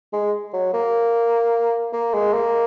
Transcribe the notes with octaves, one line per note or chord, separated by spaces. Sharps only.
G#3
F#3
A#3
A#3
G#3
A#3